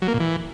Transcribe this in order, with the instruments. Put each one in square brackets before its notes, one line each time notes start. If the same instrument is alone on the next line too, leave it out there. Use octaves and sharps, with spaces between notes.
[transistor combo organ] F#3
A#3
A#2
E3